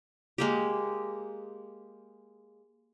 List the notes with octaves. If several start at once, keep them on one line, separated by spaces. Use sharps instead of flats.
G#3 A#3 G4